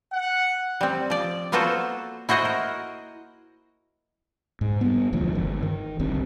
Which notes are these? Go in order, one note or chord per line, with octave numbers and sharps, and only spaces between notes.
F#5
G3 C4
F3 D5
A#3 B3 F4 F#4 A4 C5
E4 F#4 C5 D#5 F#5
A#4
G#2
G3 B3
E1 D2 F3
G1 D#3
D#3
G1 C2 G2 C3